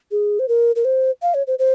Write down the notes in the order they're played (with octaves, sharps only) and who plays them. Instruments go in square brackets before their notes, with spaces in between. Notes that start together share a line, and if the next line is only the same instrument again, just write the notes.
[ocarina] G#4
C5
A#4
A#4
C5
F5
C#5
C5
C5